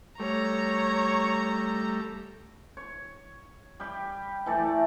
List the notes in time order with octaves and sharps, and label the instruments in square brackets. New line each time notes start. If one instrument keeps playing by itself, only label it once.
[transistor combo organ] G3 A3 [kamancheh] C#5 [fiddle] A#5
[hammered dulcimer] C#5
G3 G4
E3 A3 D5